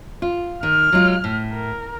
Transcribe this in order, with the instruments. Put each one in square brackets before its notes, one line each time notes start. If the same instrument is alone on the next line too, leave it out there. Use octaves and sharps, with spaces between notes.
[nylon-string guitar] F4
[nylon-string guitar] D#3 [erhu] F6
[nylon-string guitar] F#3 G#3 F4
A2
[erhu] A#4